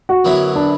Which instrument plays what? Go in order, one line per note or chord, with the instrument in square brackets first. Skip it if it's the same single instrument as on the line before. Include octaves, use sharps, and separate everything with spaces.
[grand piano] F#4
[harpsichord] F#2 D3 F#3 B3 E4
[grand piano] D4